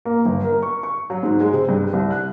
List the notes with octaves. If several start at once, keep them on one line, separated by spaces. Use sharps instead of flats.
A#3
G1
A#4
C#6
C#6
F#3
G#2
G#3
C3
G2
C2
F#6